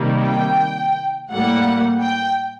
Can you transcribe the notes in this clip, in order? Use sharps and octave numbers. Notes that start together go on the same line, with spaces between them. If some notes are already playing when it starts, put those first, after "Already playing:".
Already playing: C3 D#3 G3 A#3
G5
A2 G3 A#3 F#5
G5